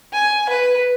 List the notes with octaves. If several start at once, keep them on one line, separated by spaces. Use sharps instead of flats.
G#5
B4